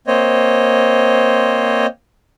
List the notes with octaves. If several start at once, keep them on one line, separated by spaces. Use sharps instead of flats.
A#3 C4 C5 C#5 D#5